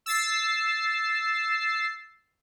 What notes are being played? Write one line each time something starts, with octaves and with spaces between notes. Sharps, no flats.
E6 A6 C7